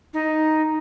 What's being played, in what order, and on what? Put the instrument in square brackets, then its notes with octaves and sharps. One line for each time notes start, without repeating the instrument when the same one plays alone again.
[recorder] D#4